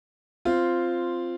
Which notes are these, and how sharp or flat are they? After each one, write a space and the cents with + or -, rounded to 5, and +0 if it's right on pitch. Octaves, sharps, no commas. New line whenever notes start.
C4 +0 F4 -5